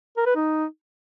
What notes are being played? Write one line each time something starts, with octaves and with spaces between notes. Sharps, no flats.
A#4
B4
D#4